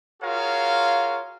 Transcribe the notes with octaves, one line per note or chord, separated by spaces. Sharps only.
F4 F#4 G#4 A#4 C#5 F5